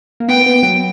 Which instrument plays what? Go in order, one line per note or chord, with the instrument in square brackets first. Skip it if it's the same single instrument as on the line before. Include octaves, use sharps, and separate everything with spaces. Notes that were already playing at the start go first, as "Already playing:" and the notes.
[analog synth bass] A#3
[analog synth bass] B3 [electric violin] G5
[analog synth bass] B3
F#3